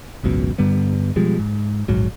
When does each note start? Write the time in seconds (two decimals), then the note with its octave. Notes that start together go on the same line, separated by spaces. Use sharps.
0.23 G#1 C#2 F#2 B2
0.58 G2 D3 G3 B3
1.16 B2 F3 G3 G#3
1.39 G#2
1.88 D1 A#1 G#2 F#3